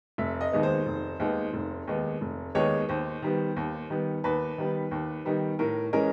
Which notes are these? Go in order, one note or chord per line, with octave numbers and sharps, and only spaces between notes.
F1 E5
D#5
D#2 D#3 G#3 B3
C5
F1
D#2 D#3 G#3 B3
F1
D#2 D#3 G#3 B3
F1
D#2 D#3 G#3 B3 C#5
D#2 C5
D#3 G3 B3
D#2
D#3 G3 B3
D#2 B4
D#3 G3 B3
D#2
D#3 G3 B3
A2 A#4
E3 G#3 C#4 A#4